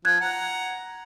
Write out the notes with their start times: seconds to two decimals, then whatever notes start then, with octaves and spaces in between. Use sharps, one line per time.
0.05 F3 F#6 G#6
0.21 F#5 A#5